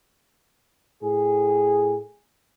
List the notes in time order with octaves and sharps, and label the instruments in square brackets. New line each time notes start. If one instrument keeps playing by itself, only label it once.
[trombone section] A2 G#4